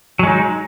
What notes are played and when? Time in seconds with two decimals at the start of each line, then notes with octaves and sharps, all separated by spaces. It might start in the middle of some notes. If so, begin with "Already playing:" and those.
0.19 F#3
0.23 G#3
0.27 D#4